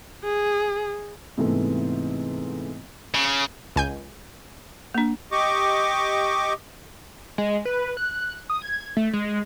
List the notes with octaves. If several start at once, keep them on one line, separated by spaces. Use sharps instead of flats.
G#4
G#2 C3 E3 A3 B3
C#3
C#2 G#5 G6
A#3 D4
G4 D#5 C#6 D6
G#3
B4
F#6
D#6
G#6
A3
G#3